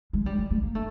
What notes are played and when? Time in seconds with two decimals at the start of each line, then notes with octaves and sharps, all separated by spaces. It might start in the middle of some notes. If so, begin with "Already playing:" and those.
0.13 G#3
0.26 G3
0.38 G#3
0.51 A3
0.63 A#3
0.75 A3